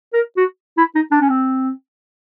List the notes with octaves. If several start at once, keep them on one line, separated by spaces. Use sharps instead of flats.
A#4
F#4
E4
D#4
D4
C#4
C4